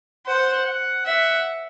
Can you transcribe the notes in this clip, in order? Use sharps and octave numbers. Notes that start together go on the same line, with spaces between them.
C5 F#5
F#5
E5 F#5